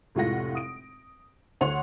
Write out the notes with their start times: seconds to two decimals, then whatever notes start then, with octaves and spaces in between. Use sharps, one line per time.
0.15 F1 A2 G#3 F4 F#5 A#6
0.55 D#6 D7
1.61 D2 C#5 F#5 C6 F7